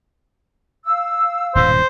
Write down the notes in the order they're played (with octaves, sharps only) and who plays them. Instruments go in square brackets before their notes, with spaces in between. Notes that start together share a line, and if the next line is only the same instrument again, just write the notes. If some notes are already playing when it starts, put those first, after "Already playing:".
[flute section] F5 E6
[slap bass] D#1 G#2 B2 [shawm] C5